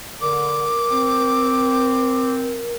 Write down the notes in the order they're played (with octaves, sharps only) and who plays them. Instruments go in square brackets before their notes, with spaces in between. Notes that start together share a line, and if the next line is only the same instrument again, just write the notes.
[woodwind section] D3 [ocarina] A#4 [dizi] D6
[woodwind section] C4